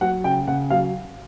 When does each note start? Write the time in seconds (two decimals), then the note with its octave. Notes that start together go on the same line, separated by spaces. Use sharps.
0.01 F#3 F#5
0.24 C#3 G5
0.48 C#3 F#5
0.70 F#3 F5